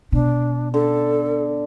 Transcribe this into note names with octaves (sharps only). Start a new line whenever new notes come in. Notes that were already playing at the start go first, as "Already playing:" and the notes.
B2 D4
D3 A4